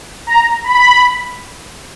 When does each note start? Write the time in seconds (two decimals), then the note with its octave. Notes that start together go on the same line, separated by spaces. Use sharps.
0.27 A#5
0.64 B5